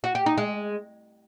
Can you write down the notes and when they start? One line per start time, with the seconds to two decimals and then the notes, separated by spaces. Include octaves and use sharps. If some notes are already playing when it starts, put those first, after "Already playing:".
0.04 F#4
0.15 G4
0.26 D#4
0.38 G#3